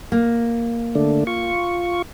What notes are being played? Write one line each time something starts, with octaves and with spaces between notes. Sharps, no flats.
A#3
D3 A3 D4
F4 C#6